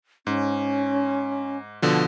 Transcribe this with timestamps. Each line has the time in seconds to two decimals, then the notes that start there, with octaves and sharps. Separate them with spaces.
0.27 G#2 C#4
1.82 B2 D3 F3